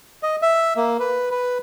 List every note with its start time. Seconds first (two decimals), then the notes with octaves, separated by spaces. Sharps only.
0.23 D#5
0.42 E5
0.77 A#3
1.00 B4
1.31 B4